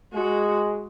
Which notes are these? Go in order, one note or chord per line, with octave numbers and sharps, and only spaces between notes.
G#3 F#4